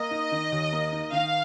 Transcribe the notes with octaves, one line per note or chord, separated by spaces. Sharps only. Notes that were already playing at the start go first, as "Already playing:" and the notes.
Already playing: A#3 D#5
D#4
D#3
D#2
A#3
D#4
D#3 F5